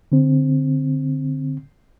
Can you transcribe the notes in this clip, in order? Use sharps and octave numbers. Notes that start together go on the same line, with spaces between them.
D3 C4